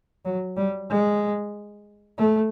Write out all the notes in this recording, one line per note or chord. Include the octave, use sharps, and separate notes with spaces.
F#3
G3
G#3
A3